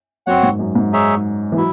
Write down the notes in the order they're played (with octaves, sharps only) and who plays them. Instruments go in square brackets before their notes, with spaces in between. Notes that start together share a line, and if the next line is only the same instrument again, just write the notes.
[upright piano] F#2 [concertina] C4 F#4 C#5 F#5
[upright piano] G#2
F#2
G#2
[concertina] D#4 G#4 C#5 E5
[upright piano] E3
[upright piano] F#3 [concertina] E4